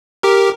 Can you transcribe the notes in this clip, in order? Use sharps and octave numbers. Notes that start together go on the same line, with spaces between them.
G4 A#4